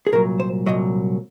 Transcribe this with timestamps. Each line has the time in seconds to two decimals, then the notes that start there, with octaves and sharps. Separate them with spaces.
0.07 G#4
0.12 C2 A#2 F#3 A#4
0.40 C5
0.66 C2 A#2 F#3 D#5